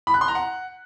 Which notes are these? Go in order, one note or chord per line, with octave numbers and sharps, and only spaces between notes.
B5
F#6
C6
A#5
F#5